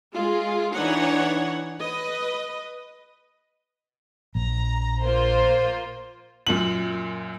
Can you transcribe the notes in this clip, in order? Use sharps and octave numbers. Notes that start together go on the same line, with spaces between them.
G#3 F4 G#4
E3 D4 D#4 C#5 F#5
B4 D#5
A#1 A#5
A#3 F4 C5
F#2 A#2 F#7